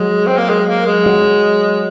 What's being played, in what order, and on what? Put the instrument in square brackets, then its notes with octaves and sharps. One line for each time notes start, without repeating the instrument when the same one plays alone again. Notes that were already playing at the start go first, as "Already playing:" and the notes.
Already playing: [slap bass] F#3 [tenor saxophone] G#3
[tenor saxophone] C4
A#3
G#3
A#3
G#3
[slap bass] F#3